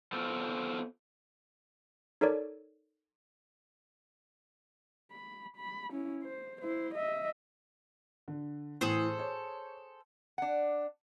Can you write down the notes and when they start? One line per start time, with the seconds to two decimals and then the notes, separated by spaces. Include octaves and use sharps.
0.13 B3 F4 F#4 A4 C5
2.21 D#4 A4 A#4 C#5 D5
5.12 B5
5.57 B5
5.91 C#4 E4
6.24 C5
6.61 E4 C5
6.95 D#5 E5
8.28 D3
8.81 A2 E3 G#4 A4 C5
9.19 C#5
10.38 D4 F#5